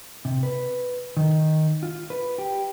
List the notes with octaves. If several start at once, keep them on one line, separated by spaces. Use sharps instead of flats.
C3
B4
D#3
F4
B4
G4